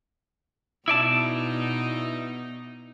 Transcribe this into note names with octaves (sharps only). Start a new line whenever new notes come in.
B2 D#4 E4 D5 A5